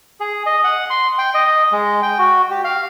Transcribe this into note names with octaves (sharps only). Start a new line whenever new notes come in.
G#4
D#5
F#5
C6
G5
D#5
G#3
G5
F#4
G4
F5